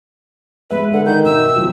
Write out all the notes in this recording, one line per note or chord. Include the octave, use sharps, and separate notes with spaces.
G#3 B4 E5
D3 F#5
D#3 G6
B2 E5 E6
F#2 B2 F3